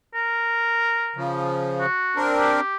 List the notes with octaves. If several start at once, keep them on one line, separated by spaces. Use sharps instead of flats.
A#4
C#3 F3
F#4
C4 D4 A#4
G4